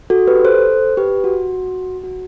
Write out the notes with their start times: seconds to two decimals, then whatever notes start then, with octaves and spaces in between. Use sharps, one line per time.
0.10 F#4 A4
0.27 G4 B4
0.44 A4 C5
0.97 G4 B4
1.24 F#4
2.04 F#4